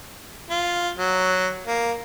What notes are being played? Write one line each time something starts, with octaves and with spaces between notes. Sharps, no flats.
F4
F#3
A#3